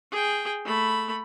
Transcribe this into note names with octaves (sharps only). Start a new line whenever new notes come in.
G#4 G5
A3 B5